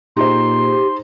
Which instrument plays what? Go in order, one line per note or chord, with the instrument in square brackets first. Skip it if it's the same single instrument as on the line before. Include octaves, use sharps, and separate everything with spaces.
[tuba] A#2 [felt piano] D#4 G#4 C5 [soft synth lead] G4 [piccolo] C6